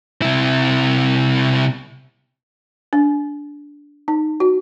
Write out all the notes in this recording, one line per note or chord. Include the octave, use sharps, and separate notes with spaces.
C3 E4
D4
D#4
F#4